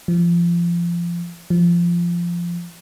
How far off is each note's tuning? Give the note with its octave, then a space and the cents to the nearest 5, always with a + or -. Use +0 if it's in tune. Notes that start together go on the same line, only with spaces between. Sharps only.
F3 -25
F3 -15